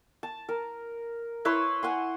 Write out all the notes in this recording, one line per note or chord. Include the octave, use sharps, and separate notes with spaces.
A5
A#4
E4 B4 C#5 C6
F#5 G#5 C6